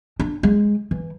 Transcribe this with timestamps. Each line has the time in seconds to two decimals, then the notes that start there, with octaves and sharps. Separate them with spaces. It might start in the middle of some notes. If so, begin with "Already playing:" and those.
0.20 D4
0.43 G#3
0.91 E3